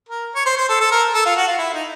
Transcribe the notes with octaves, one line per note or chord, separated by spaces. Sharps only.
A#4
C#5
C5
C5
A4
A4
A#4
A4
F4
F#4
F4
E4
D#4